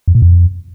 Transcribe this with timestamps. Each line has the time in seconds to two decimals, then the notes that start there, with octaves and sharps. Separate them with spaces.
0.08 F2
0.15 A#2
0.22 F2